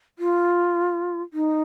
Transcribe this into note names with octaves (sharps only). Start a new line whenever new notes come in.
F4
D#4